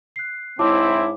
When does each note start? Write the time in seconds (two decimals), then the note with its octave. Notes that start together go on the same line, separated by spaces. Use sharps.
0.16 F#6 C7
0.59 G#2 C4 E4 C#5 A5 D6